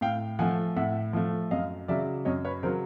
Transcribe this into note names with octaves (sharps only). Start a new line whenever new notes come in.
A2 F5 G5
F3 A3 F#5 G#5
A2 E5 F#5
F3 A3
F#2 D#5 F5
C#3 F#3 D5 E5
F#2 C#5 D#5
B4 C#5
C#3 F#3 A#4 C5